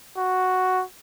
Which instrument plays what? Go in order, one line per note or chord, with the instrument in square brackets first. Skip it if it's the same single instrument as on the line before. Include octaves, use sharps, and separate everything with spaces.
[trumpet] F#4